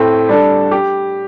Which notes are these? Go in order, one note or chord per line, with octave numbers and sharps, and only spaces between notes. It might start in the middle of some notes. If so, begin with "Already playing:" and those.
Already playing: A2 A3 C4
G3 D4 A4
G4